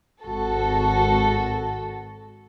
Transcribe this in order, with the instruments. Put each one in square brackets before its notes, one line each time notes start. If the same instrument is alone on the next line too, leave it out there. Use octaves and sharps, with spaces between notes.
[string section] G#1 F#4 A4